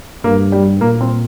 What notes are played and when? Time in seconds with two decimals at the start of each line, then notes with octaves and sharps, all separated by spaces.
0.24 G2 A#3
0.52 G3
0.81 A#2 A#3
1.01 C4